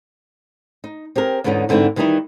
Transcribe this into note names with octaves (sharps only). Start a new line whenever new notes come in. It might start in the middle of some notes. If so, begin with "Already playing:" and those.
D#4
C4 G4 G#4 A#4
E2 G#2 D3 B3 C#4 D#4
G#2 D3 E3 C4 E4
D#3 E3 G3 C#4 D#4 E4